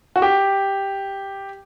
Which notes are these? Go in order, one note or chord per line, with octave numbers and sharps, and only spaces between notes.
F#4
G4